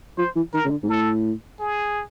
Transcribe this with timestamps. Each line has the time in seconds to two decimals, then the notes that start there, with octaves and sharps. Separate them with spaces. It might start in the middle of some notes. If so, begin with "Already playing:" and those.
0.18 F3 C5
0.36 E3
0.53 D#3 A#4
0.65 C#3
0.70 D3
0.83 G#2
0.89 A2 A4
1.60 G#4